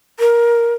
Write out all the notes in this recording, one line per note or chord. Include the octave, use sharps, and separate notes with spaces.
A#4